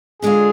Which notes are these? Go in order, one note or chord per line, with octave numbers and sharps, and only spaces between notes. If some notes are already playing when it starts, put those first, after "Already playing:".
D3 G#3 D4 F4 G#4